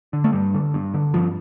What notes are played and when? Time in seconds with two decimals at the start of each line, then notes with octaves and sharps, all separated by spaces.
0.13 D3
0.24 A3
0.33 G2 G3
0.54 D3
0.74 G2
0.94 D3
1.14 G2 F3